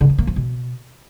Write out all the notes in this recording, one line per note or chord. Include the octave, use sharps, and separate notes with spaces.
D3
F3
A#3
F3
B2